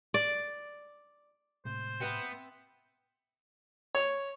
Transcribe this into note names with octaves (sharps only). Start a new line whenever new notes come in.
D5
A2 C3 G#3 C5
B3 C4 B4 E5
C#5